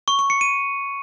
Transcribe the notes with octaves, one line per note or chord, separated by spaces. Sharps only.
C#6
C#6
C#7
D#7